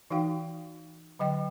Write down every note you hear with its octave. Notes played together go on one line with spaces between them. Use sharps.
E3 D#4 F#4 F5 G5
D3 F#3 D#5 G5